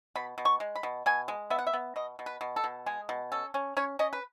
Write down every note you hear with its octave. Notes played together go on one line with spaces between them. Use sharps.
B2 B5
B2
C#6
G#3
B5
B2
B2 G#5
G#3
B3 E5
F#5
E5
B3
B2 D#5
B2
B4
B2
A4
B2
G#3 G#4
B2
C#4 A4
C#4
C#4 C#5
C#4 D#5
B4